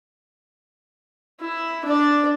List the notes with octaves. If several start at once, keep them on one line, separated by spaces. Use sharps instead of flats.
E4
D4 D5